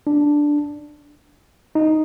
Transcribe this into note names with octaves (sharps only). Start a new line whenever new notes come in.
D4
D#4